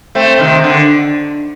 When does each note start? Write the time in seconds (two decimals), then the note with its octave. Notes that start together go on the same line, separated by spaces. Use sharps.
0.15 A3 C4
0.39 C3 D#3
0.64 D3